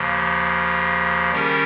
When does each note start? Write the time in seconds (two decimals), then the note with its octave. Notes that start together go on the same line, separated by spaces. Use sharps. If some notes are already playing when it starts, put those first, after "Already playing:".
Already playing: D#2 C#3 F3
1.32 D#3 G3 C#4 G4 A#4